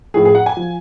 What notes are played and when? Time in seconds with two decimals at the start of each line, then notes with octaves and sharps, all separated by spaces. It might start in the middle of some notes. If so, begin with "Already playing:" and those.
0.14 A2 F3 G#4
0.25 G#4
0.35 F#5
0.46 G#5
0.57 F3